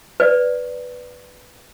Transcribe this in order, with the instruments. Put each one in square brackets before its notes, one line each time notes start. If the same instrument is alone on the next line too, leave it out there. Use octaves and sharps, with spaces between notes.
[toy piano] B4 D5